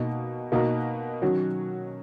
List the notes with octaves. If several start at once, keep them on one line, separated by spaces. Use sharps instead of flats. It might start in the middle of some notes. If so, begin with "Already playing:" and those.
Already playing: B2 A#3 D#4
B2 A#3 D#4 F#4 A#4
D#3 F#3 C#4 F#4